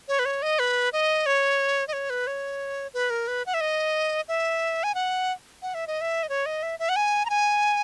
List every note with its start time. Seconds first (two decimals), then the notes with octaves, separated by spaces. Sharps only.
0.08 C#5
0.19 B4
0.25 C#5
0.42 D#5
0.59 B4
0.93 D#5
1.26 C#5
1.88 D#5
1.93 C#5
2.10 B4
2.27 C#5
2.94 B4
3.10 A#4
3.28 B4
3.46 F#5
3.54 E5
3.61 D#5
4.28 E5
4.84 G#5
4.95 F#5
5.62 F#5
5.74 E5
5.87 D#5
6.01 E5
6.23 D#5
6.29 C#5
6.46 D#5
6.63 E5
6.79 E5
6.89 F#5
6.96 G#5
7.25 A#5
7.30 G#5